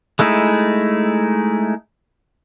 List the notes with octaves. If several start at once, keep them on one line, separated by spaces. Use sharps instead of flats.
G#3 A3 D#4 E4 G#4